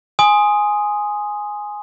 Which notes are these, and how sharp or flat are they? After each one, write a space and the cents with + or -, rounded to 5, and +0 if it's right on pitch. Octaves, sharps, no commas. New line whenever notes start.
G#5 +0 C6 +0 D#6 +0